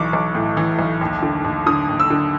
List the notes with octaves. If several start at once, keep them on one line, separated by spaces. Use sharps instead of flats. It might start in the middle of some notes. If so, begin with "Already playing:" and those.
Already playing: B1 E3 C#6 D6
B1
A2
E3
B1
D#2
D3
D#2
D3 D#6
D#2
E6
D3